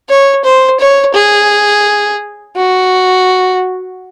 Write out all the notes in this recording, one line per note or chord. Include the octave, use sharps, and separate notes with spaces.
C#5
C5
C#5
G#4
F#4